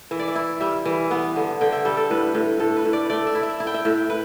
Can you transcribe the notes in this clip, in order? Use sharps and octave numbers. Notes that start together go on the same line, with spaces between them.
E3 E5
D5
E5
E4
G3 E5
E3
B3
D3
D3 G5
E5
G3 A4
A4
A2 B4
A2
A2 A4
B4
A2
D5
A3 D5
E5
E4
E5
E4 E5
G5
E5
A2
B4